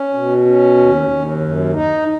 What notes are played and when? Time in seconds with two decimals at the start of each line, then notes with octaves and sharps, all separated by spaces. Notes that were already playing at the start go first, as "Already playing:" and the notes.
Already playing: C#4
0.14 B2
0.46 C#4
0.77 D#2
1.09 D#2
1.40 F#2
1.73 D#4